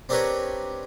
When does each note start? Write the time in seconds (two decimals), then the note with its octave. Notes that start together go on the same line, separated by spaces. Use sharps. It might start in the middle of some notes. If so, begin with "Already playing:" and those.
0.09 C4 D4 G4 A#4 B4 C#5